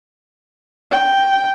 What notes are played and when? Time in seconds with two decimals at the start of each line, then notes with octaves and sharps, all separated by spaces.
0.92 G5